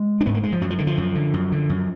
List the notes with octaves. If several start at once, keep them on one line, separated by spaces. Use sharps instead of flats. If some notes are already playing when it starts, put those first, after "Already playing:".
Already playing: G#3
D4
G#2 B3
A#3
G#3
F3
F#2 F#3
F3
D3 D#3
F3
F#2
D3
F#2
D3
F#2